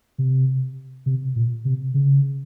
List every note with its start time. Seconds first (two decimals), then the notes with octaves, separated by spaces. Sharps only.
0.18 C3
1.06 C3
1.36 A#2
1.65 C3
1.94 C#3